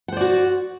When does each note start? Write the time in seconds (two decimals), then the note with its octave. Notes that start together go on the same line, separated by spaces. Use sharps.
0.08 F#5
0.13 C5
0.17 D5
0.21 F#4